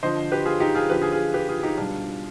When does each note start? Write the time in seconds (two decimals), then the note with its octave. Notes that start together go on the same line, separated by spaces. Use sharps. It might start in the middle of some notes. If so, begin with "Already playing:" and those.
0.03 D3 F3 C5 D#5
0.32 G4 B4
0.46 F4 G#4
0.60 D#4 G4
0.75 F4 G#4
0.90 D3 F3 G4 B4
1.01 F4 G#4
1.12 F4 G#4
1.34 G4 B4
1.49 F4 G#4
1.63 D#4 G4
1.78 B2 G3 D4 F4